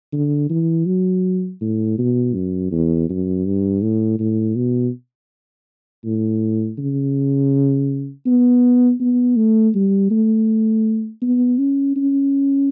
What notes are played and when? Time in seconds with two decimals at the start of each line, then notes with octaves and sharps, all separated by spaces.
0.12 D3
0.50 E3
0.86 F#3
1.61 A2
1.98 B2
2.35 F#2
2.71 E2
3.09 F#2
3.46 G2
3.82 A2
4.19 A2
4.56 B2
6.05 A2
6.78 C#3
8.26 B3
9.00 B3
9.36 A3
9.75 G3
10.10 A3
11.22 B3
11.59 C#4
11.96 C#4